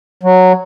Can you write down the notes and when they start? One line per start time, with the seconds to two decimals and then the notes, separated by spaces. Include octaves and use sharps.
0.23 F#3